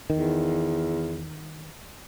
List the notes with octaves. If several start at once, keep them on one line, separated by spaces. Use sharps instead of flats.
E2 D#3